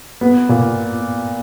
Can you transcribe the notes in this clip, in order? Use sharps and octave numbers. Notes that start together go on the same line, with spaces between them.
B3
A#2